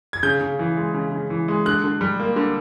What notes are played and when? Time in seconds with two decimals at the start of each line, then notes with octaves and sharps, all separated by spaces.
0.13 G#6
0.23 C#3 G6
0.41 C#3
0.59 E3
0.77 G#3
0.94 C#3
1.12 C#3
1.30 E3
1.48 G#3
1.65 D3 F#6
1.84 D3
2.01 G3
2.20 A#3
2.36 D3